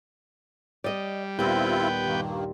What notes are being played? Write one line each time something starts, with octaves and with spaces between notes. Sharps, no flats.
G3 D5 D#5
D#2 A#2 G3 B3 C4 E4 F4 G5
G2 D#3 A#3